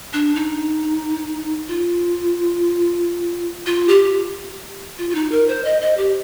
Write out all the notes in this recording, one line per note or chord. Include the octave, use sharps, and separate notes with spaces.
D4
D#4
F4
F4
G4
F4
F4
D#4
A#4
C5
D#5
D#5
G4